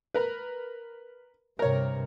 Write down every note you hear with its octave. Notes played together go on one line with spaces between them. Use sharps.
A#4 B4
G2 C3 A#4 C#5